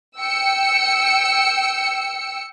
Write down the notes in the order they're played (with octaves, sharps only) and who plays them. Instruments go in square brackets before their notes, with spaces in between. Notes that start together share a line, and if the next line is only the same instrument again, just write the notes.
[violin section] G5 E6 C#7